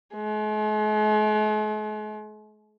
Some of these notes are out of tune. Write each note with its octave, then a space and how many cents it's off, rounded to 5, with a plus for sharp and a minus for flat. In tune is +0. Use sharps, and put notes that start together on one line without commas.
G#3 +45